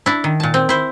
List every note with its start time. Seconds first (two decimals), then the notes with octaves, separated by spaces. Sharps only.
0.06 D4 E4
0.24 D#3
0.40 A#2 A5
0.54 C4
0.69 E4 C5